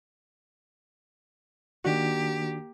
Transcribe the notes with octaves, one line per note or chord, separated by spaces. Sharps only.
D#3 A#3 D4 F#4 G4